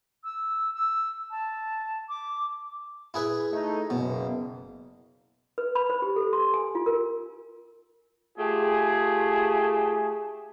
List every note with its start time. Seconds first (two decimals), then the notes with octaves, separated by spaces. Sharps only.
0.24 E6
0.74 E6
1.31 A5
2.09 D6
3.14 E4 G#4 B4
3.52 A3 D#4
3.90 F#1 B2
5.58 B4
5.75 B5
5.90 C5
6.02 G4
6.16 A4
6.33 C6
6.54 G#5
6.75 F4
6.86 A#4
8.38 A3 F4 G4 G#4